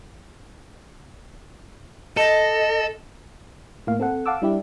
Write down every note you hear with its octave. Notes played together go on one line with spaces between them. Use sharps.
A4 D#5
A2 A#3 F5
C4 A4 F#5
F5 F#5 A5 D6 E6
G3 D4 E4 G4